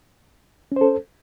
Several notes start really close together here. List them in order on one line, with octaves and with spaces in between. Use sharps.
C#4 C5 A4